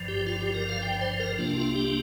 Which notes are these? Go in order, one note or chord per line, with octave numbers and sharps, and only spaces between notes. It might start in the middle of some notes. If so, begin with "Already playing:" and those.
Already playing: G1 G2 F3
G4
F4
G4
A#4
F5
G5
C5
A#4
C2 C3 A#3 D4 F4
F4
G4